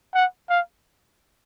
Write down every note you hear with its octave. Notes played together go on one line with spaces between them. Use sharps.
F#5
F5